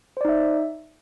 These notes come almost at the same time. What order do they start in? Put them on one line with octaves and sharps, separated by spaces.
C5 D5 D#4 E5